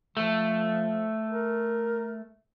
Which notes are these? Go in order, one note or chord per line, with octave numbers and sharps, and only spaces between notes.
F3 A3
A#4